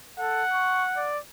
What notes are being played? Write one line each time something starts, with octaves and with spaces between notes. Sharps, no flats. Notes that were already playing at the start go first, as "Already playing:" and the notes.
A4 F#5
C#6
D5